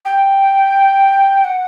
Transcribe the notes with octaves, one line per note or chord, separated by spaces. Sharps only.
G5
F#5